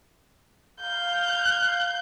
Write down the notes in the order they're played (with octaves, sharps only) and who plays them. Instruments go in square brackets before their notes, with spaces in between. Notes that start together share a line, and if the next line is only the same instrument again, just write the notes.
[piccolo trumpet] F5 [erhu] G6